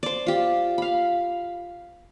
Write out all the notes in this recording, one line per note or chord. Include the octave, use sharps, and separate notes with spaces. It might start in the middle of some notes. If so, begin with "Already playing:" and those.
C5 D5
F4 G4
F5 B5